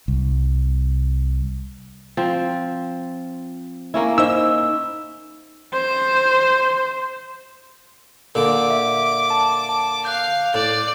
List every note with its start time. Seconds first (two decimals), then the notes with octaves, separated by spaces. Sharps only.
0.08 C2
2.17 F3 C4
3.94 A#3 C#4 E4
4.18 D#4 C5 D#5 E6
5.73 C5
8.35 A#2 D3 A4 D6
8.70 E5
9.30 A5
9.69 A5
10.05 F5 F#6 G6
10.54 A2 D5